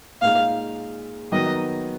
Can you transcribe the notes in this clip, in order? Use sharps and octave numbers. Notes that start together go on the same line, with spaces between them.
A#2 G#3 D#4 F5
D#3 F#3 B3 D#4 D#5